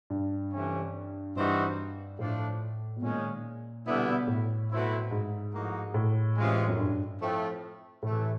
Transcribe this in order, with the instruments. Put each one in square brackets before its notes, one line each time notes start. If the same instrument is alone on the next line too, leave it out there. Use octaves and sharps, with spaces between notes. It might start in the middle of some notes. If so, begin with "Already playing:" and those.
[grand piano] G2
[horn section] C3 E3 A3 C#4
[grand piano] G2 [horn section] E3 G3 C4 D#4 F#4
[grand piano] A2 [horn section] F3 A3 D4
[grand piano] B2
[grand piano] A#2 [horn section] D#3 G#3 C#4
[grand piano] B2 [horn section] D3 G3 B3 E4
[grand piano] B2
A2
[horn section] B2 F#3 A3 C4 E4
[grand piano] G#2
[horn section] A2 F3 A#3 D#4 F#4
[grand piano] A2
[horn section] C3 E3 G#3 C#4 F4
[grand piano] F#2
G2
[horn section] A2 F3 A3 C4
[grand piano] A2 [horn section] C3 E3 A3